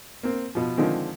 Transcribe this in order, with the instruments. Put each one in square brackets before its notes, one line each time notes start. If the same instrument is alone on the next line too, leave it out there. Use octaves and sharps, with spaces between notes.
[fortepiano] A#3 C4
B2 F3
D3 D#3 F3 G#3 C4